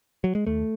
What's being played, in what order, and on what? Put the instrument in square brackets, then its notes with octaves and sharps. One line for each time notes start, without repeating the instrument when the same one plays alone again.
[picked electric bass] F#3
G#3
D#2 A3